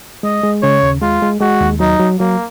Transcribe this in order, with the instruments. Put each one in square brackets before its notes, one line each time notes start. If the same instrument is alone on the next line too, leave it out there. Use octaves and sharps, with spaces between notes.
[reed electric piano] G#3 [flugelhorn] D#5
[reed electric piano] G#3
[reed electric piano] C#3 [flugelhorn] C#5
[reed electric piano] D#2
[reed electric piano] G#3 [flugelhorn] F4
[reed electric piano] G#3
[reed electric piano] G#3 [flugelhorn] F#4
[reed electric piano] D#2
[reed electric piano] F#3 [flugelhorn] D#4
[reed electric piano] F#3
[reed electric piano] F#3 [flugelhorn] A#3